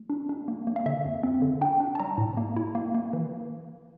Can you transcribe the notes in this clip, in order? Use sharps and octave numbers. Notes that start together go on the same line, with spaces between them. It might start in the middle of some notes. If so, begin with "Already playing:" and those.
Already playing: A3
D4
D4
A#3
A#3
F5
D3 E5
F2
C4
D3
D4 G5
D4
A5
G3 A#5
A2
A#3
E4
A#3
A#3
E3